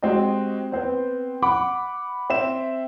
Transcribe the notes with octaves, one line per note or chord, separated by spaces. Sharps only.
G#3 C4 F#4 G4 D#5
B3 C4 C5
F#5 B5 D6
C4 E5 E7